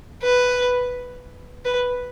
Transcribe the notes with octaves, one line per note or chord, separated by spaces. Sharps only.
B4
B4